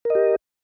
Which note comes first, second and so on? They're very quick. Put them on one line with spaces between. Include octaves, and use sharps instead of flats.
A#4 D#5 G4